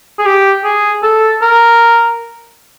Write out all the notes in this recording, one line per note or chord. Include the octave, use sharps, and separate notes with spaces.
G#4
G4
G#4
A4
A#4